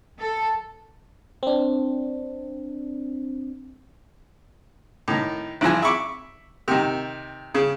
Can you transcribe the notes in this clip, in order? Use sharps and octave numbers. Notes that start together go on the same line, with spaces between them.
A4
C4 D4
A2 D#3
G#1 E3 F3 G#5
E5 B5 C#6 D6
C3 D#3
C#3